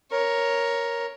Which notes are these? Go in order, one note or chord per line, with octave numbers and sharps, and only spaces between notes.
A#4 C#5